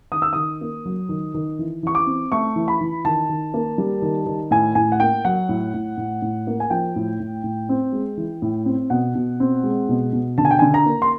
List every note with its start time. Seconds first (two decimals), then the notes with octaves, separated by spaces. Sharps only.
0.12 D#3 D#6
0.22 E6
0.33 D#3 D#6
0.61 A#3
0.85 F#3
1.09 D#3
1.34 D#3
1.59 E3
1.83 E3 C#6
1.95 D6
2.07 C4
2.32 A3 C#6
2.56 E3
2.68 B5
2.81 E3
3.05 D#3 A5
3.29 D#3
3.54 A#3
3.78 G3
4.02 D#3
4.26 D#3
4.51 A2 G#5
4.75 A2 G#5
4.92 F#5
5.00 A#3 G5
5.25 F#3 F#5
5.49 A2
5.74 A2
5.97 A2
6.22 A2
6.47 A#3
6.60 G#5
6.70 F3 G5
6.96 A2
7.20 A2
7.44 A2
7.69 C4
7.92 G#3
8.17 E3
8.42 A2
8.66 C4
8.90 B2 F#5
9.15 B2
9.40 C4
9.64 G#3
9.89 B2
10.13 B2
10.38 D3 A5
10.45 G#5
10.51 G5
10.59 D3 G#5
10.74 A#5
10.86 A#3
11.02 C6